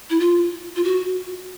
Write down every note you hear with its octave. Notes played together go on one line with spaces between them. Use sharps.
E4
F4
F4
F#4